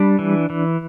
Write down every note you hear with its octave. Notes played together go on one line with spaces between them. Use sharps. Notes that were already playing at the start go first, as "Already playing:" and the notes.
Already playing: G3 D4 B5
E3
E3